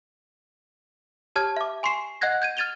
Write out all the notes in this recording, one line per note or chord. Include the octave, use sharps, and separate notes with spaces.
G4 C#5 A5 F6 G#6
E5 D6
G#5 C6 C#6 C7 E7
D#5 F#5 F#6 G#6 A#6
G6 G#6 D#7
F6 G#6 A6 D#7 F7 G7